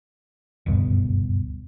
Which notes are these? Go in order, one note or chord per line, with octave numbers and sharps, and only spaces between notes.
F#1 D2 G2 B2